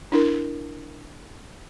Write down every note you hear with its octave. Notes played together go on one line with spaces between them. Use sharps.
D4 E4 A#4